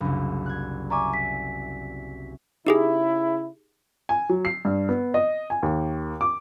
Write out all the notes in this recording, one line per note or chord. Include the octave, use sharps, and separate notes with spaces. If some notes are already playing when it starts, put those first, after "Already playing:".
F#1 C2 D4 B5
F#6 G#6
D5 E5 G#5 A#5 C#6 D6
B6
C#3 D#4 E4 G4 G#4
G#5
F#3
C7
G2
B3
D#5
G#5
D#2
D6